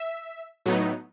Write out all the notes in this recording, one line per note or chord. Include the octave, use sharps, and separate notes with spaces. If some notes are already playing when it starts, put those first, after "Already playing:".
Already playing: E5
A2 F#3 B3 D#4